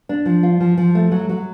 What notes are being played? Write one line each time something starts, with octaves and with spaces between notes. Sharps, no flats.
D4
F3
F4
F3
F3
A3
F#3
F#3